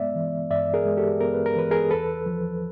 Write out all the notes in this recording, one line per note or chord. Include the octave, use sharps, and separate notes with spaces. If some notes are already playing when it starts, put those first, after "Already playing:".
Already playing: G2 G#3 B3 D5 E5
E3
G2 D5 E5
G#4 A#4
G#3
G4 A4
B3 A#4
B4
A#4
E3 B4
G#4 A#4
E2 A4 B4
F3